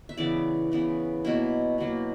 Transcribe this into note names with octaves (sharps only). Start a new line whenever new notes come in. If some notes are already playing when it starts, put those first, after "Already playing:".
E5
C#3 E3 B3 D5
C#3 E3 B3
B2 F#3 A#3 E4
B2 F#3 A#3